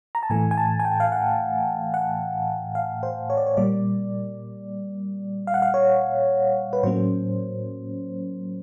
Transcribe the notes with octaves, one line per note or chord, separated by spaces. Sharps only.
A#5
A5
A2 E3 A3 G#5
G#5
A5
G#5
G5
F5
F#5
F#5
F5
C5
C#5
D5
C#5
A#2 G3 A#3 D5
F5
F#5
F5
C#5
B4
A2 F#3 A#3 C#4 C5